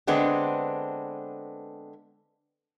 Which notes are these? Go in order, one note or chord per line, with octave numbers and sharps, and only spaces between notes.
D3 G#3 B3 C4 D4